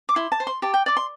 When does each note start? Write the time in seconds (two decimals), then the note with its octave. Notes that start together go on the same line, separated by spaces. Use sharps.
0.09 D6
0.16 E4 C6
0.32 A5
0.40 C5
0.47 C6
0.62 G4 A5
0.74 G5
0.86 D5 D6
0.97 C6